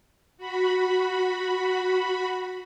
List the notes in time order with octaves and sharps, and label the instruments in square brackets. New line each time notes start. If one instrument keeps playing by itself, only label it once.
[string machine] F#4 B5